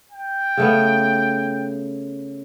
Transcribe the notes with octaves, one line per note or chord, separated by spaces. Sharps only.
G5
C#3 A3 B3